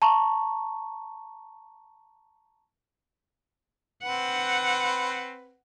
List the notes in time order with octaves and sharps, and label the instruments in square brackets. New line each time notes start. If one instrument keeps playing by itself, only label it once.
[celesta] A5 A#5 C#6
[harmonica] C4 B4 [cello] F#5